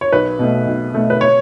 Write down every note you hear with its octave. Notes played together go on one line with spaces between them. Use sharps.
C#5
B1 B4
B2 A3
B1
B2 A3
B4
C#5